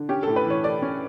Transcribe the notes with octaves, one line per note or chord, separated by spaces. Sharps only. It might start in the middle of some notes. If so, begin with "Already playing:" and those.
Already playing: D3
C#4 G4
A4
A2
B4
E3 C#5
A3 D5
C#4